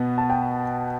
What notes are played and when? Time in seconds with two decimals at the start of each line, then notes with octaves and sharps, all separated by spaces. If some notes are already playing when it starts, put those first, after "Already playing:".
Already playing: B2 B3
0.18 A5
0.30 G5